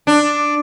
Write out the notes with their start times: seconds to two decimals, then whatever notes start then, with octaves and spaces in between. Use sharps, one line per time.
0.07 D4